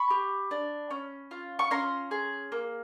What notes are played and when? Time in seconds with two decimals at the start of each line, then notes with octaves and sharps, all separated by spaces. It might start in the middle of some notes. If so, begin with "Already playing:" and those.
Already playing: B5 C#6
0.10 G4
0.51 D4
0.91 C#4
1.31 F4
1.59 C#6
1.71 C#4 A#5 C6
2.11 G#4
2.52 A#3